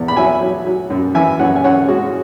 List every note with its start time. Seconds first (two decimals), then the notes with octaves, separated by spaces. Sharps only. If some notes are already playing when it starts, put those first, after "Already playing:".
Already playing: E2
0.08 B5
0.16 F#3 E5 G#5
0.42 F#3
0.67 F#3
0.90 F#2
1.15 E3 E5 G#5
1.39 F#2 C#5 F#5
1.56 G#5
1.64 F#2 C#5 F#5
1.88 G#3 C#4 F#4